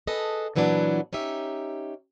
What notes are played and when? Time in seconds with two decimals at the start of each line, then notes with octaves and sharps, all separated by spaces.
0.07 G#4 A4 B4 D#5
0.56 A#2 E3 F#3 B3 D4
1.13 C#4 D#4 G4 E5